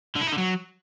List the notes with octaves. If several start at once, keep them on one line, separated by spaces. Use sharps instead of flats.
D3
E4
D#4
D3
F#3